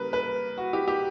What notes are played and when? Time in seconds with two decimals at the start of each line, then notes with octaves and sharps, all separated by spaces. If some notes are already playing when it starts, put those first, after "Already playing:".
Already playing: C#3 G3 A#3 A#4 B4
0.13 B4
0.58 F#4
0.73 G4
0.88 G4